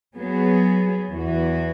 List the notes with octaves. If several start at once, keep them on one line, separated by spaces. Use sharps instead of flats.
F#3 B3 G#4
E2 E3 B3 F#4